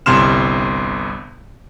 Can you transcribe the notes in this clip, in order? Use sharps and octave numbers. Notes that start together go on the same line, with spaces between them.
G1 C2 C3 C6 F6 E7